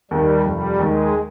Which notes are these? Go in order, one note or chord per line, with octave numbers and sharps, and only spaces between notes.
D#2 D#3 G3
F1 G3
D#2 D#3 G#3